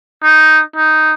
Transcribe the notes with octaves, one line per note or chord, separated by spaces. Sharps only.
D#4
D#4